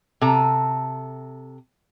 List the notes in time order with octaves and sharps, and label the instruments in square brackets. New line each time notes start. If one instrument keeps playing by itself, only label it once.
[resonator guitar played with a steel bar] C3 A4 A#5